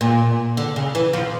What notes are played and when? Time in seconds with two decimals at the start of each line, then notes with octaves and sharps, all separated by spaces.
0.01 A#2
0.57 D3
0.76 C#3
0.95 E3
1.13 F3